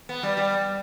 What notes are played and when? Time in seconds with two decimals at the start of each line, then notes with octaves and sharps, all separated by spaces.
0.09 B3
0.23 G3
0.37 G3